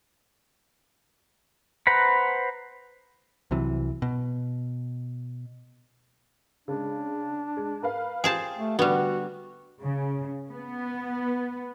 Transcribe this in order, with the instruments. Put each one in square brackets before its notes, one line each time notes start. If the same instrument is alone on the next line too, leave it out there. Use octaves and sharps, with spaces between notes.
[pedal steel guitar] B4 C5 F#5 A#5 B5
[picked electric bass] C2 C3 E3 F#3
B2
[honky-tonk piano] C#3 G#3 [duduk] D4
[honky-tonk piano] G#3
A#4 B4 F5
[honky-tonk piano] F4 G4 [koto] G#4 C5 A5
[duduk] A3
[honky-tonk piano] D3 [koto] G3 B3 [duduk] F#4
[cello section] C#3
B3